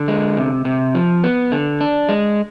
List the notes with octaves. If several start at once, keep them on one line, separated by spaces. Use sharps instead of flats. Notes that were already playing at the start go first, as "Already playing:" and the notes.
Already playing: D3
G#3
C3
C3
F3
B3
D3
D4
G#3